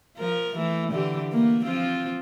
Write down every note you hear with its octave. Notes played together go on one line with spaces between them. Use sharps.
F3 A#4
E3 A3
D3 E3 G4
A3 A#3
F3 C4 F4